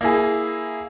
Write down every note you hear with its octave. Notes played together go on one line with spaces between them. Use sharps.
A#3 E4 G#4